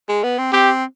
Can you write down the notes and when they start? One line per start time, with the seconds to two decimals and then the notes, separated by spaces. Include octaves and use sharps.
0.08 G#3
0.23 B3
0.38 C4
0.52 C4 G4